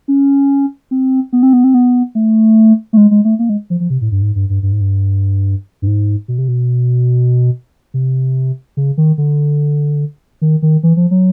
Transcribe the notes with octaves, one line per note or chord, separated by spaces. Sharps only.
C#4
C4
B3
C4
B3
C4
B3
A3
A3
G#3
G#3
A3
A#3
G#3
F3
F3
C3
A2
G2
G#2
G2
G2
G2
G#2
G2
G2
G#2
B2
C3
B2
C3
C#3
D#3
D3
D#3
D#3
E3
F3
F#3